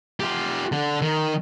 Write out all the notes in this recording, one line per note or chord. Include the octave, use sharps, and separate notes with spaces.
F4 G4
D3
D#3